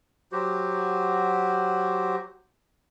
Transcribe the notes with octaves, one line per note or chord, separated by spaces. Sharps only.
F#3 F#4 G4 C5